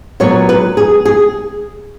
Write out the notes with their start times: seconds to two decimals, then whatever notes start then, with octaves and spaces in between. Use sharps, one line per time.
0.20 A#2 F#3 B3 C#5
0.49 B4
0.77 G#4
1.05 G#4